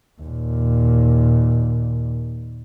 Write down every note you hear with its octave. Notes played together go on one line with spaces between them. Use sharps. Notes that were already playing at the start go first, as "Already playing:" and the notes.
D#2 A#2